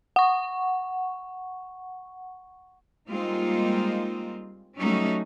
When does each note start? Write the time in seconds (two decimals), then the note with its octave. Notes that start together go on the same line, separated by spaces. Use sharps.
0.16 F#5 C#6
3.09 G3 G#3 A#3 C4 D#4 F4
4.78 F#3 G3 A3 C#4 D#4 F#4